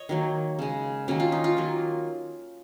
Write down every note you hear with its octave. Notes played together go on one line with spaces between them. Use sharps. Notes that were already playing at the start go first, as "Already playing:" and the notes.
Already playing: C#5 D#5
D#3 F#3 A#3
C#3 G#3
D#3 F#3 A#3 C#4
F4
D#4
F4
D#3 F#3 A#3